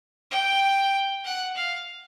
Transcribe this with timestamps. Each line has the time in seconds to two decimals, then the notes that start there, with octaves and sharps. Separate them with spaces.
0.31 G5
1.24 F#5
1.56 F5